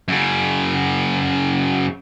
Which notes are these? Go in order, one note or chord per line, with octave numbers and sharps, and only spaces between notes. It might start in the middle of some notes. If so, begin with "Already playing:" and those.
F#2 C#3